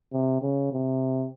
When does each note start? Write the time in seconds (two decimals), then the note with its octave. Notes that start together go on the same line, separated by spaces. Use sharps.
0.13 C3
0.42 C#3
0.72 C3